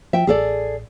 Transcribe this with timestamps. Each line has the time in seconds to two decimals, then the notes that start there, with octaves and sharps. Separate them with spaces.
0.13 F3 E5 G5
0.27 A1 G#4 A4 D5